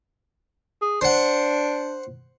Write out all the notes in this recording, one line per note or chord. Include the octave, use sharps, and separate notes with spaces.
G#4
D4 C5 F#5